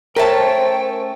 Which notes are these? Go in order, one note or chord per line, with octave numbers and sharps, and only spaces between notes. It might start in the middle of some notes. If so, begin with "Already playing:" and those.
A3 C#4 A#4 C5 E5 G5 A5